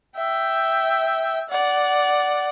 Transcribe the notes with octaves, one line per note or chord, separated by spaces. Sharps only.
E5 G5
D5 F#5